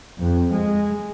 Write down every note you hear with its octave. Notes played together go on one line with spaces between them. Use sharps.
F2
G#3